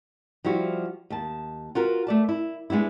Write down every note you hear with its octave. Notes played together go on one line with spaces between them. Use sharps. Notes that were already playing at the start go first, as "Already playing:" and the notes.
F3 G3 E4 F#4
D#2 A5
F4 F#4 A#4 B4
A3 D5 A5
E4
G#3 B3 D4 E4